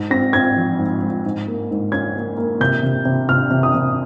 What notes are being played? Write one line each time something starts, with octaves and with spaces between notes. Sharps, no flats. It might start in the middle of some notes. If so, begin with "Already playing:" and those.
Already playing: G#2
C4 A#6
C4 G#6
F3
G#2
G#2
G#2
A#3
G#2
C#4 G#6
A#3
A#3
C3 G6
C3
C3
C3 F6
C3
D#6
C3